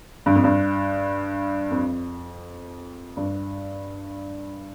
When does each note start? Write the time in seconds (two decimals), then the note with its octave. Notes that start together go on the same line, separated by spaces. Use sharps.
0.26 G2
0.35 F2
0.44 G2
1.71 F2
3.17 G2